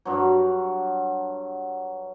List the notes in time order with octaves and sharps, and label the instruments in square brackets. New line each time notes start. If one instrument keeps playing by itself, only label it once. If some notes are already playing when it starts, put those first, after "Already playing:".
[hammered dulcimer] G2 F#3